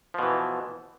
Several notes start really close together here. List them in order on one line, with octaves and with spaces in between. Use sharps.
F3 B2 E3